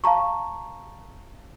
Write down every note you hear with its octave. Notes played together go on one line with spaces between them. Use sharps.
F5 A5 A#5 C#6